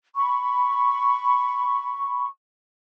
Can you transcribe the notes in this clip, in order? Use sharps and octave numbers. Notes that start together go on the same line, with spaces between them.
B5 C#6